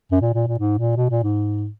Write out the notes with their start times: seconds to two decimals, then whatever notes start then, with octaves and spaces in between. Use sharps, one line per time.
0.12 F#2
0.21 A#2
0.34 A#2
0.47 A#2
0.59 G#2
0.78 A#2
0.97 B2
1.10 A#2
1.23 G#2